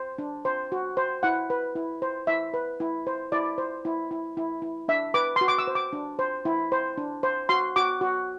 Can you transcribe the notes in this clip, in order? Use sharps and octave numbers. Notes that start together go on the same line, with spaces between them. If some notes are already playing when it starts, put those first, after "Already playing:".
Already playing: C5
D4
C5
F#4
C5
E4 F#5
B4
E4
C5
E4 E5
B4
E4
C5
E4 D5
C5
E4
E4
E4
E4
D4 E5
B4 D6
C6
F#4
D6
E6
C5
D6
D4
C5
E4
C5
D4
C5
F#4 C6
F#4 D6
F#4